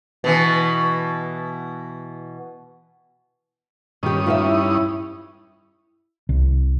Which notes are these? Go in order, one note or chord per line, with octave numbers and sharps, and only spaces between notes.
B2 E3
G2 D#3 C#4 G4 D#6
D#4 F4 C5 E5
E4
E4
C2